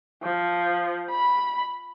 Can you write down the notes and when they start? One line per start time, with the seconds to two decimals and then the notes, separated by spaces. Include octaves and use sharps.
0.23 F3
1.10 B5